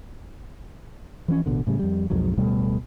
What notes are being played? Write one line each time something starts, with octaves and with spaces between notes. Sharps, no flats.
E3 F3 A3 C#4
A1 B2 D3
A2 C#3 G3
F2 G3
B1 F2 G#2 F#3
D1 B2 G3 A3